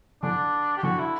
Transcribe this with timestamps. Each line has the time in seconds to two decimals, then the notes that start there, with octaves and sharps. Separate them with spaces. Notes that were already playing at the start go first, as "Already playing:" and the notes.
0.23 D3 D4
0.77 G4
0.83 D3 F#4
0.99 E4